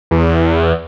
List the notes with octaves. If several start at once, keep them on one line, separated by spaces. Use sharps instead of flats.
E2